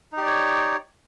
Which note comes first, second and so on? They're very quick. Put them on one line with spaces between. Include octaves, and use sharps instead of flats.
D#4 G4 D5 C#5